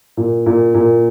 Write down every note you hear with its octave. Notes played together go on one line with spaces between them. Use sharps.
A#2
A#2
A#2